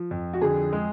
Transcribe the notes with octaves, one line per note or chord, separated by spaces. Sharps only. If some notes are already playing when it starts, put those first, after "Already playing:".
Already playing: F3
F2
F#4
D3 G#4
G#3